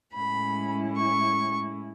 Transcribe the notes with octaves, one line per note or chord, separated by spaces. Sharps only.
A2 G#3 C#4 E4 B5
C#6